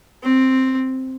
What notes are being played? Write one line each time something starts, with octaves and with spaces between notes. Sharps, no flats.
C4